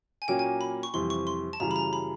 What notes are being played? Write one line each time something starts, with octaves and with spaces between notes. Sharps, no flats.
G#5
A#2 F#3 A#3 C#4 G5
G#5
B5
C#6
F2 C3 E3 G3 C6
C#6
C6
A5
F#2 C#3 E3 G3 A#5
B5
A#5
B5